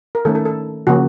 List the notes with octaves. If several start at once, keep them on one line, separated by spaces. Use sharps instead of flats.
A#4
D#3 A3 C#4 A4
A4
A4
C#3 F3 A#3 C#4 F#4